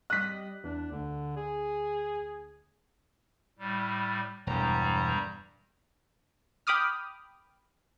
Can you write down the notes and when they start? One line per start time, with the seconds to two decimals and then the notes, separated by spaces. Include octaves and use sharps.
0.10 G3 D#5 F#6 B6
0.64 E2 D4
0.91 D2 D3
1.37 G#4
3.59 A2 G3
4.47 E1 E2 G2 G3 A#5
6.67 G5 B5 D6 D#6 F6